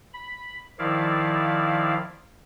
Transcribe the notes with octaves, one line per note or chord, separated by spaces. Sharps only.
B5
D#3 F3 E4 D5 F5